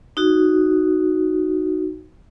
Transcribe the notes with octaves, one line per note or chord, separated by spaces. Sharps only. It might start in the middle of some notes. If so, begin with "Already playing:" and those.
D#4 F#4